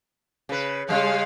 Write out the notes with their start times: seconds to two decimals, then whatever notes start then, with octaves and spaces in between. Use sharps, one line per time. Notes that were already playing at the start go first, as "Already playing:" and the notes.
0.49 C#3 B4
0.89 C#3 G3 G#3 F5